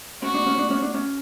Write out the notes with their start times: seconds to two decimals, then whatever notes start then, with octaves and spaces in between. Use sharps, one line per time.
0.22 C#4 F#4
0.34 D4
0.46 C#4
0.58 D4
0.70 C#4
0.82 D4
0.94 C#4